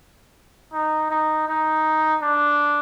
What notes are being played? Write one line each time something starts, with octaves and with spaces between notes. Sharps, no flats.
D#4
D#4
D#4
D4